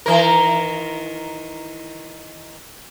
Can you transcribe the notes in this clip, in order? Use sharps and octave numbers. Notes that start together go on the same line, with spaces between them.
D#3 E3 A#4